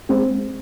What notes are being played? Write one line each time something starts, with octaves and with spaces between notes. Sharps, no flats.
G#3 C4